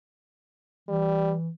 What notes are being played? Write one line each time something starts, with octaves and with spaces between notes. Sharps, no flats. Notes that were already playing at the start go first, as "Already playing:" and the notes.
E3 G3